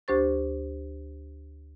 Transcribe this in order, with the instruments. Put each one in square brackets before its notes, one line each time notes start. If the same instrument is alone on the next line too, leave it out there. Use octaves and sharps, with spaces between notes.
[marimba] D2 D4 G4 C5 C#6 A6